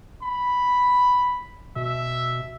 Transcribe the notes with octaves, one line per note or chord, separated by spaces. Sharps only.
B5
B2 E5